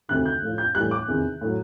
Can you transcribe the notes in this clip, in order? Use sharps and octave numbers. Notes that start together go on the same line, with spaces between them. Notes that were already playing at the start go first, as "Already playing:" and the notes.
D2 C3 D#3 F#6
G6
A2 F3
G6
A2 E3 G3 F#6
D6
E2 C3 D#3
A2 F#3